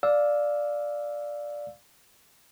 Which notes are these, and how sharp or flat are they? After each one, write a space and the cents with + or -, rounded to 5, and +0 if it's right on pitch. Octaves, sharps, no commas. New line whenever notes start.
D5 +0 F5 +15 E6 +0